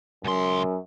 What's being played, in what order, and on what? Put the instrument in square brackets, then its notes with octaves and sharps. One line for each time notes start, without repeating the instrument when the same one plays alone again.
[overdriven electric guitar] C#2 C6 [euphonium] F#2